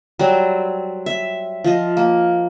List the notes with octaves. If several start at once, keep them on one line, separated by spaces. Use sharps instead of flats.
F#3 G3 C4
E5
F3 D#5
A#3